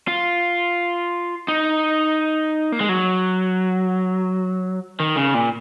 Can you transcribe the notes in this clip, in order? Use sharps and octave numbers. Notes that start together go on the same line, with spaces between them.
F4
D#4
A#3
G#3
F#3
D#3
C#3
A#2